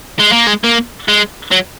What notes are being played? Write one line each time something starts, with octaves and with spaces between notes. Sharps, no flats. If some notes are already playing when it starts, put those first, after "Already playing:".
G#3
A#3
G#3
A#3
G#3
F#3